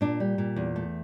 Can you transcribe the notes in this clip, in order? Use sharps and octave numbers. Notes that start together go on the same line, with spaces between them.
A#2 D4
G3
A#2
E2
A3